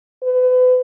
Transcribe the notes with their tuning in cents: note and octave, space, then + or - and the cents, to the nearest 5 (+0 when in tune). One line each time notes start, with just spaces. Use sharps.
B4 +35